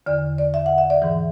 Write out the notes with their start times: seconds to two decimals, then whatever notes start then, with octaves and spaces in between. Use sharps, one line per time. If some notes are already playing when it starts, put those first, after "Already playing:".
0.06 E2 D3 D5
0.38 D5
0.54 E5
0.66 F#5
0.78 E5
0.90 D5
1.02 G#2 E3